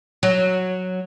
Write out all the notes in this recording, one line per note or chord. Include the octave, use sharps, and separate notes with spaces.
F#3